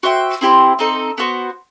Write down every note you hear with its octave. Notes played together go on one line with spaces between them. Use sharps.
F#4 C5 E5 G5
C4 E4 G4 C5
C4 D#4 A4 D#5
B3 F#4 C5